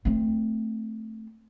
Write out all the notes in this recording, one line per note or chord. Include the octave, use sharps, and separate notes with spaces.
A3 C4